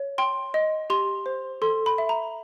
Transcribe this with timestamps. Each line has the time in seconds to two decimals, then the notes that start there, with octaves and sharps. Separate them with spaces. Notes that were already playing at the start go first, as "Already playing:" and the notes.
Already playing: C#5
0.18 G5 C6
0.54 D#5
0.90 G4 C6
1.26 C5
1.62 A4 C6
1.86 B5
1.98 E5
2.09 A#5